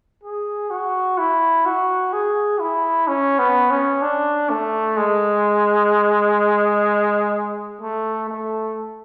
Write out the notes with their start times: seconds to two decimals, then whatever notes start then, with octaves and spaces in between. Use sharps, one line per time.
0.23 G#4
0.70 F#4
1.18 E4
1.65 F#4
2.13 G#4
2.60 E4
3.08 C#4
3.39 B3
3.70 C#4
4.02 D4
4.50 A3
4.97 G#3
7.81 A3
8.29 A3